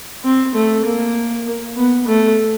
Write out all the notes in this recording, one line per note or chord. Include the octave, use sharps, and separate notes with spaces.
C4
A3
A#3
B3
A3